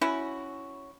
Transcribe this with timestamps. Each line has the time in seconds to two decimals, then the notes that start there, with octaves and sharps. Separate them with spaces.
0.01 C#4 E4 F#4